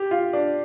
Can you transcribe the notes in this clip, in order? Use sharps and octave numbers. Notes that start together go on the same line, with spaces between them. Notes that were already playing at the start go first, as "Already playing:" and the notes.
Already playing: G4
F4
D4